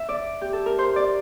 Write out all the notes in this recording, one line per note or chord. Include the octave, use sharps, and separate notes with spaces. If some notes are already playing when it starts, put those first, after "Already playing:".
Already playing: E5
D5
G4
A4
A#4
C5
D5